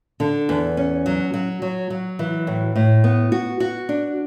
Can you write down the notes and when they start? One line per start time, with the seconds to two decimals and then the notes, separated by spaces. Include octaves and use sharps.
0.20 D3
0.49 E2
0.77 C#4
1.06 F#3
1.34 F#3
1.62 F#3
1.90 F#3
2.19 E3
2.47 A2
2.76 A2
3.04 B3
3.32 F#4
3.60 F#4
3.89 D4